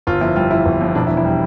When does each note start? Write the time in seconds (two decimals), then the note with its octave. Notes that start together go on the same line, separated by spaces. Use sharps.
0.07 G1 F4
0.21 F2 E4
0.36 G3 F4
0.51 E3 E4
0.66 G1
0.81 F2
0.95 E1 D4
1.07 E4
1.10 E2
1.17 E4
1.25 G3